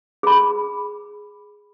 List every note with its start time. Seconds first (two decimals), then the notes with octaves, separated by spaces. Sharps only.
0.23 G#4 B5